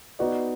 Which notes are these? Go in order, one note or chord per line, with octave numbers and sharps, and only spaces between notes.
B3 D#4 F#4 B4 D5